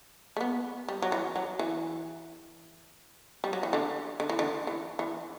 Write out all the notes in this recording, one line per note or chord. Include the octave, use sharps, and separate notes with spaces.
A3
B3
G3
F#3
E3
F#3
E3
G3
F#3
E3
D3
D3
E3
D3
E3
E3